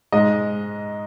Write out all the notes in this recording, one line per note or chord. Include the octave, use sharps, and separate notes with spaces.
G#2 G#3 D#5